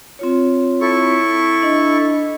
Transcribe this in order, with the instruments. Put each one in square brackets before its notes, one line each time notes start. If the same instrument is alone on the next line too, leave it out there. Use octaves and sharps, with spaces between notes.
[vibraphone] C4 F4 C#5
[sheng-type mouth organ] E4 A4 C#6
[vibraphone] D4 D#5